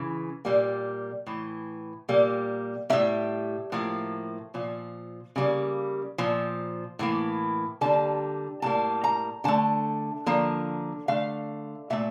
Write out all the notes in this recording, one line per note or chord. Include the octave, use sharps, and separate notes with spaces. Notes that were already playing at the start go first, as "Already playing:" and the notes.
Already playing: C#3 E3
A#2 G3 A#3
A2 E3
A#2 G3 A#3
A2 G3 A#3 E5
A2 F3 A#3
A#2 F3
C#3 G3 A#3
A#2 F3
A2 E3 A#3
D3 G3 A#3 A5
A2 G3 A#3 A5
A#5
D3 A3 A5
D3 F3 A#3
D3 A3 F5
A#2 A3 E5